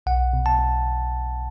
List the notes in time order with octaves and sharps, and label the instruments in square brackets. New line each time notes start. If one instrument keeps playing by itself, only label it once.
[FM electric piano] B1 [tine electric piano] F#5
[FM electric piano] B2
[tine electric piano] A5
[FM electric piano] B1